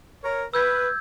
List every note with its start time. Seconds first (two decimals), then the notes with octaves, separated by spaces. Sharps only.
0.24 A#4 C#5
0.54 B4 E6 G6 G#6